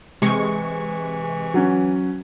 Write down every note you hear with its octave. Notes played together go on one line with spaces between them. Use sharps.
C3 E3 G#3 C#6
F#3 C#4